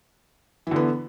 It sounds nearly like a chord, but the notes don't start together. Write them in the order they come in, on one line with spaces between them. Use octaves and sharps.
E3 D3 B3